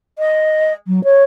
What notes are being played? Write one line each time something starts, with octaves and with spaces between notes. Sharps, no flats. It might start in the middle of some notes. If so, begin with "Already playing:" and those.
D#5
F#3
C#5